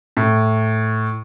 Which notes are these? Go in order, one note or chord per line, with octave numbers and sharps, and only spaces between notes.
A2